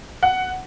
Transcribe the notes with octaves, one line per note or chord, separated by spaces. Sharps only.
F#5